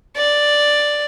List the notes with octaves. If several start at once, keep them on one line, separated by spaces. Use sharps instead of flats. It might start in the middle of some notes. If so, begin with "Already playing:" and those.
D5